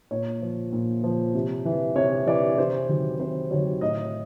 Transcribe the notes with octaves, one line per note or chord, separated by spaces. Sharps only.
A#2 C#5
F3
A#2
F3
C3
E3
C3 C#5
E3 D5
C3 C5
D#3 F#3
C3 C5
D#3 F#3 C#5
A2 D#5